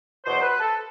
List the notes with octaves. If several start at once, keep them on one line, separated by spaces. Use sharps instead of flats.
E2 B2 F#3 C5
B4
A4